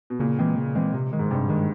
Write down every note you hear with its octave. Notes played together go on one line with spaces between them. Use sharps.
B2
A#2 C#3
E3 G#3 C4
C#3
E3 G#3 C4
C3
D#3 G#3
G#2
G2 C3
D#3 G#3